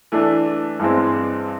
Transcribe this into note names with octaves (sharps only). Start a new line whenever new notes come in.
E3 A3 D4
G2 E3 G#3 C4